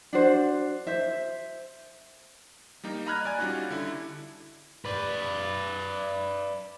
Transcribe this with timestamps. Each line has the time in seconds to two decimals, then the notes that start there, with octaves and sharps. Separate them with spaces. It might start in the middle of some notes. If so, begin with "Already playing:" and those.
0.13 D4 F#4 C5
0.87 C5 E5
2.84 G3 A#3 D#4
3.06 D#5 A#5 B5 F6 F#6 G#6
3.25 D5 G#5 G#6
3.39 G3 C#4 D#4 F4 F#4
3.70 D3 E4
4.85 B4 D5